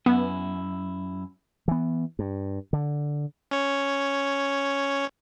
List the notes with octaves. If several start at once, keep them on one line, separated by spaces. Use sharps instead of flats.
F#2 B3 E4
E3 B3
G2
D3
C#4 C#5